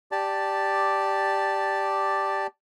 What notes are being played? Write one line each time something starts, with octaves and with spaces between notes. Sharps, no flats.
G4 D5 A5